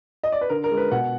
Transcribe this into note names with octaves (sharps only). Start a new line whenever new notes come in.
D#5
D5
B4
D3 A#4
A#4
G#3
B4
B2 F#5